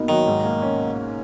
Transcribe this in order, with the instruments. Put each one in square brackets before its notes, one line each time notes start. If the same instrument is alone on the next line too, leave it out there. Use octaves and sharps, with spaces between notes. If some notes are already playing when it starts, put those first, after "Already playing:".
Already playing: [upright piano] B2 A#3 B3 D#4
[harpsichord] D#3 [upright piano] F#3
[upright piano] G#2
A#3
C#4